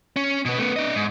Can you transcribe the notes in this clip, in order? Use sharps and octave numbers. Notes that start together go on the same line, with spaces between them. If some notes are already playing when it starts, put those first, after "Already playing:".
C#4
B2 B3
A3 B3
D4 D#5
G#2